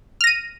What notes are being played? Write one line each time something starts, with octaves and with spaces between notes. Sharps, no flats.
F6 A#6 D#7